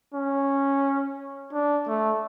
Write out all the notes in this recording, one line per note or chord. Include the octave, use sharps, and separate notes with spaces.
C#4
D4
A3